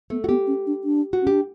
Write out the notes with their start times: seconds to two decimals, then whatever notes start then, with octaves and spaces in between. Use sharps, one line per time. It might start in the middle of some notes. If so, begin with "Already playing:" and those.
0.10 A3 B3
0.24 F#4
0.29 B3 G4
0.47 C#4
0.67 D4
0.84 D4
1.13 F#4
1.22 C#4
1.27 D4 G4